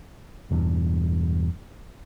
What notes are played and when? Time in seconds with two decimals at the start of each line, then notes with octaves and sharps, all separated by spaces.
0.51 E1 E2 G2